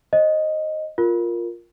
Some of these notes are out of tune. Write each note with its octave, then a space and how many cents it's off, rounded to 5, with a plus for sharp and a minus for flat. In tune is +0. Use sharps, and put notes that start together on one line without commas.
C5 +30 D#5 +0
F4 +0 A#4 +0